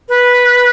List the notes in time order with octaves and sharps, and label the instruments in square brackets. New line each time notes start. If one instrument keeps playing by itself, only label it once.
[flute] B4